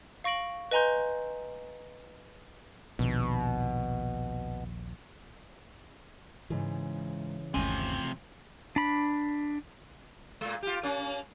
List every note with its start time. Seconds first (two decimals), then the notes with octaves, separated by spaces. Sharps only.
0.24 F5 C#6 A#6 D7 F#7
0.71 B4 D#5 G#5 A#5 C6 G6
2.99 A#1 D#2 B2
6.50 G#2 C#3 E3
7.54 G1 D#2 C3 F3 A3 C#4 G#5
8.76 D4 B5
10.41 A#2 G#3
10.63 F4 G4
10.83 A#3 C#4